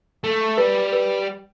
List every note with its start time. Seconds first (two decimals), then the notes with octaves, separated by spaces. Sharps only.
0.24 A3
0.57 G3 B4
0.92 B4